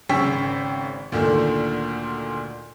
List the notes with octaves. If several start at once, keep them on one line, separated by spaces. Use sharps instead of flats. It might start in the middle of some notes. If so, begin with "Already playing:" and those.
G#1 C#3 G5 C#6 E6 B6
D2 A#2 D3 D#3 A3